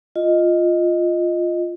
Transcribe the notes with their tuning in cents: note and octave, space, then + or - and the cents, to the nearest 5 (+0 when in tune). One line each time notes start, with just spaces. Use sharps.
F4 +0 D#5 +0